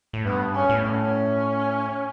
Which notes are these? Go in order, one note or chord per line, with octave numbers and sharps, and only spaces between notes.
A2
G2 B3
C#4
A2
C#4